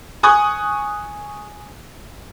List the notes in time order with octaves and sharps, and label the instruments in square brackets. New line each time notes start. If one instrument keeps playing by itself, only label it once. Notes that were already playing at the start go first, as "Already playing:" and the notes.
[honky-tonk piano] G#5 C#6 D#6 F#6